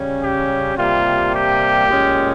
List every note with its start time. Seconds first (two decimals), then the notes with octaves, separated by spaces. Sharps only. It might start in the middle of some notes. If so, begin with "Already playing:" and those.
Already playing: C#3 G3 C#4
0.22 G4
0.77 C3 G3 A#3 F4
1.33 G4
1.88 A#2 G#3 C#4